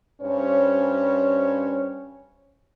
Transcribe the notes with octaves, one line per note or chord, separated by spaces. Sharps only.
G2 C#4 C5 C#5